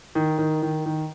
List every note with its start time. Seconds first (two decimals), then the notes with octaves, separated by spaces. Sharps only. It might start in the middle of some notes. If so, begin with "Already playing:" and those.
0.15 D#3
0.38 D#3
0.62 D#3
0.86 D#3